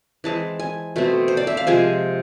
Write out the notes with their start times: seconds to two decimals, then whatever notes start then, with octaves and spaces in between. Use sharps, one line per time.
0.24 E3 G#3 C4 A5
0.60 G#5
0.96 B2 A3 C4
1.28 C5
1.37 D5
1.47 E5
1.57 F5
1.67 C3 F3 G#3 G#5